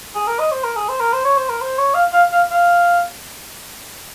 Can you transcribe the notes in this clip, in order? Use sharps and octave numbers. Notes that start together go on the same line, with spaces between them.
G#4
A#4
D#5
C5
A#4
G#4
C5
A#4
C5
C#5
C5
A#4
C5
C#5
F5
F5
F5
F5